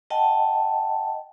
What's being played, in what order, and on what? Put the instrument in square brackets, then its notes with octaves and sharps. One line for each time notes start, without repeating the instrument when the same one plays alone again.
[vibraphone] D#5 F#5 G5 A5